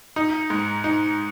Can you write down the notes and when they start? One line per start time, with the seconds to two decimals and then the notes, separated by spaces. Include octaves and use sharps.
0.16 D#4
0.50 G#2
0.84 D#4